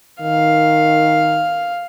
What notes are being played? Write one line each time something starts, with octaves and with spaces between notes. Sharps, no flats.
D#3 F5